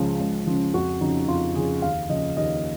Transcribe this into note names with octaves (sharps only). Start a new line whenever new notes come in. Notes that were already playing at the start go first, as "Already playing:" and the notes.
Already playing: C#2 C#3 F3
C#2
C#3 F3
F2 F#4
C#3 F3 D#4
F2 F4
C#3 F3 G#4
D#2 F5
C#3 F3 D#5
D#2 D#5